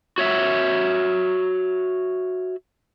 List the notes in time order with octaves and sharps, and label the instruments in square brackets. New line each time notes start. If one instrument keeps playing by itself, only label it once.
[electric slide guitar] F#4 C#5 E5